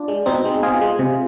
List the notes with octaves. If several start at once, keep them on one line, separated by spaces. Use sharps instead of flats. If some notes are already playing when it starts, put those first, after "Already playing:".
Already playing: D4 F4
G#3
B2 C4 D#4
G#3
B2 F4 G#4
G#3
C3